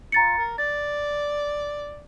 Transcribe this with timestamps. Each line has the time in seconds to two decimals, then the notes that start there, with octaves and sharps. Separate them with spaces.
0.12 F4 A#5 A6 C#7
0.38 A#4
0.58 D5 A6